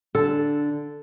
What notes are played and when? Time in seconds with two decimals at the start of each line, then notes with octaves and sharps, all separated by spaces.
0.15 D3 A4